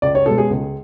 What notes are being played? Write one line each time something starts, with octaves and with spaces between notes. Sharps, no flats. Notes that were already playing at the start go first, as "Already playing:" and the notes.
C#2 D5
C#5
B2 G#3 A4
G#4
C#2